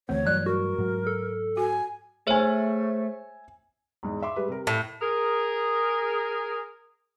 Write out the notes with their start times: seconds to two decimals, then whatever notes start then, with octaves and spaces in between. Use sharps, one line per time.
0.09 D2 E3 A3 C4 C#5
0.26 G2 E3 F#3 D5 F#6
0.46 F#4 A#4
0.78 G#2 F#3
1.07 A4
1.57 F#4 G#5
2.27 A3 G#4 C5 C#5 E5 G#5
4.03 E2 G#2
4.22 E5 C6 D6
4.36 G3 G#3 B4
4.48 C3 A#4
4.67 A2 A5
5.01 G#4 A#4